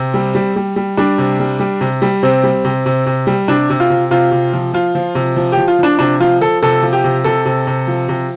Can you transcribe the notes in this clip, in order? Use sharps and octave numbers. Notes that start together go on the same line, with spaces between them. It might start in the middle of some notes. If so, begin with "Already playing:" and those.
Already playing: C3 C4
G3
G3
G3
G3
G3 D4
C3
G3
G3
C3
G3
C3 C4
G3
C3
C3
C3
G3
C3 D4
C3
F4
C3
C3 F4
C3
F3
F3 F4
F3
C3
F3
F3 G4
F4
F3 D4
C3 D4
F3 F4
F3 A4
C3 A4
F3
G4
C3
C3 A4
C3
C3
F3
C3